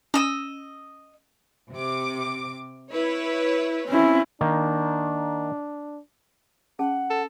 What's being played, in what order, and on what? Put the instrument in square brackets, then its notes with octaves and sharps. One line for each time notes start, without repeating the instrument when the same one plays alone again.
[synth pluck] C#4 [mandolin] D#5 E6
[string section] C3 D6
E4 B4 C#5
[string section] C4 [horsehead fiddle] C#4 E4
[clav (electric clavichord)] D#3 A#3 [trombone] D4
[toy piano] C#4 G#4 A5 [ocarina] F#5
[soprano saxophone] A4